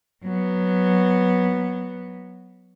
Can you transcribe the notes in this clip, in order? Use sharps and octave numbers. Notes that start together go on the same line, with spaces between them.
F#3 B3